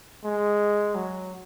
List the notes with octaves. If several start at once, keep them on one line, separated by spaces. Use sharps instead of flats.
G#3
F#3